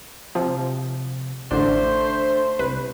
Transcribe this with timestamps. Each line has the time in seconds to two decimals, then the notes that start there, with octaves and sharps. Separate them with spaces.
0.35 C3 F3
1.51 A1 D3 A3 D4 C5
2.59 C2 B4